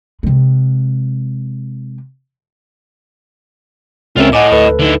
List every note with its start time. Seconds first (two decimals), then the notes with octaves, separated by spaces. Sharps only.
0.23 C3 G#3
4.17 C#2 C4 C#4 F4 A#4 E5
4.33 A2 D#5 F#5 G#5 D6
4.52 D2 A4 B4
4.80 D3 D#4 E4